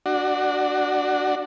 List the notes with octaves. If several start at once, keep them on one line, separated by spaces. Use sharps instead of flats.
D4 F#4